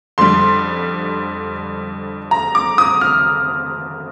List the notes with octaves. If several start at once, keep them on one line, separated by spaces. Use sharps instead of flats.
F2 D3 G3 C6
A#5
D6
D#6
F6